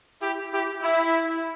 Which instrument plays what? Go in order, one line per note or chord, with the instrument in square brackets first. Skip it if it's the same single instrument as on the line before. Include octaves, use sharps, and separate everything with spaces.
[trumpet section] E4 G4
E4 G4
E4